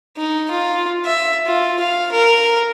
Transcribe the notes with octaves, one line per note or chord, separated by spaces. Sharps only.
D#4
F4
E5
F4
F5
A#4